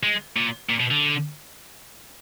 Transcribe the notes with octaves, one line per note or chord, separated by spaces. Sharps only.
G#3
A#2
A#2
B2
D3